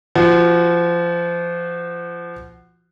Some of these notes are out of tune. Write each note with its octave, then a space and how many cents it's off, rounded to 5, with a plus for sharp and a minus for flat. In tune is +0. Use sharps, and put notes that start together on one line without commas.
F3 -25 F#4 +0